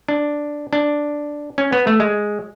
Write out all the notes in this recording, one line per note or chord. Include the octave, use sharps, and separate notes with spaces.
D4
D4
C#4
B3
A3
G#3